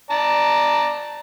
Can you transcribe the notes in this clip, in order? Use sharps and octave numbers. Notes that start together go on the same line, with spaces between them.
D5 A5 A#5